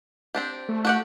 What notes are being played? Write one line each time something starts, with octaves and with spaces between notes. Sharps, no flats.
C4 D4 G4
A3
F#4 G4 F#5